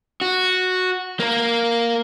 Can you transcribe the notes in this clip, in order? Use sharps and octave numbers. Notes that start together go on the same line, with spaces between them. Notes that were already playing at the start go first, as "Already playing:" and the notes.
F#4
A#3 A#4